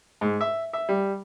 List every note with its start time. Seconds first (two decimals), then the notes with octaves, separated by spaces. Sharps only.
0.21 G#2
0.41 E5
0.73 E5
0.89 G3